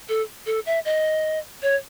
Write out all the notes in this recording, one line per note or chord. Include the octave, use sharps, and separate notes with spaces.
A4
A4
E5
D#5
C#5